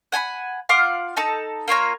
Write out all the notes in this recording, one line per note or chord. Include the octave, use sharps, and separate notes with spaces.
F#5 G#5 A5 B5
F4 F5 F#5 D6
D#4 A4 A5 A#5
A#3 F4 C#5 A#5